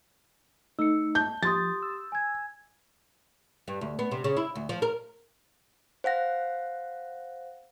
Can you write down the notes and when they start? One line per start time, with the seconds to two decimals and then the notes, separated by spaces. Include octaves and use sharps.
0.79 A3 D#4 E6 C#7
1.15 A5 G6
1.43 F3 G4 C6 D#6 A6
1.83 E6
2.12 G#5 G#6
3.68 G2
3.81 D2
3.99 B3
4.11 C3
4.24 C#3
4.37 E4
4.55 D2
4.69 F3
4.82 A#4
6.04 C5 F5 F#5 A#6